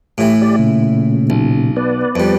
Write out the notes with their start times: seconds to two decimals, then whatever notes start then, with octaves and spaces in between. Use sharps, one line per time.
0.18 A2 E3 G4
0.42 G4 D5
0.59 A#2 C#3
1.30 B1
1.77 B3 B4 D5
2.15 F2 G3